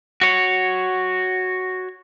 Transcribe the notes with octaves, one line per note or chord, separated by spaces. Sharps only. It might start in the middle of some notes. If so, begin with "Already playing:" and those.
F#4 C#5